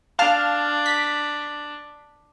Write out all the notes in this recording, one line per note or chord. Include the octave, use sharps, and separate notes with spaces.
D4 F5 A5 F6
B6